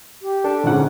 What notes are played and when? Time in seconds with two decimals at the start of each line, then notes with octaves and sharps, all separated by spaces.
0.22 G4
0.44 D4 A4
0.64 A#1 G#2 D3 C4 C#4 F#5